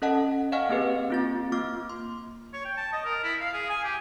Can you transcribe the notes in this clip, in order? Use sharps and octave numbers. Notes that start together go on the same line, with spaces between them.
C#4 A4 D#5 F#5 A5
D#5 F5 F#5 G#5 C#6 F6
A#3 C4 G4 G#4 B4
C4 F4 A6
A#3 F4 D6 F6
C6
C#5
G5
A5
D#5
A#4
E4
F5
G#4
G#5
G4